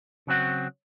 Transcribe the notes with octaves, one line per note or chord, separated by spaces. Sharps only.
C#3 F#3 C4 F#4